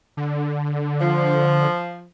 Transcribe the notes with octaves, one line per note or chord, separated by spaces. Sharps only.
D3
F3